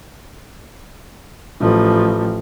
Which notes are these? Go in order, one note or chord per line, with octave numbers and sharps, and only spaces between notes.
A1 F3